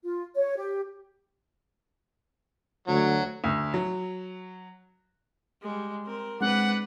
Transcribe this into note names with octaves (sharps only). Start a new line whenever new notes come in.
F4
C#5
G4
D2 F#3
D2
F#3
G3 G#3
C4 A#4
G#3 C4 D4 B4 F#5